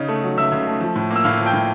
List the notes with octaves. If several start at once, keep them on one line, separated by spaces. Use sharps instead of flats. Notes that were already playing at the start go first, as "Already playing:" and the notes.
Already playing: C#3 D#4
A3
F#3
C#2 E5 E6
C#3
A3
F3
A2
A#3
E6
A2 F5 F6
F3
G5 G6
A2